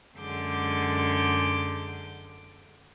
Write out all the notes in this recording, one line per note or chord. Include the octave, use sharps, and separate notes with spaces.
F#2 D3 G#3 D6 G6